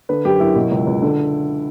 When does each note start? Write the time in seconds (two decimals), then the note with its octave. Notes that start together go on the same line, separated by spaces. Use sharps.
0.09 D3 B4
0.25 F#2 G4
0.40 F#2 E4
0.56 B2
0.71 C#2
0.87 C#2
1.02 D3